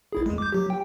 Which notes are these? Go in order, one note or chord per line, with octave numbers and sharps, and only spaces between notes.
A1 E4 G#4
E2 G#3
D6 G6
F#3 G4
G5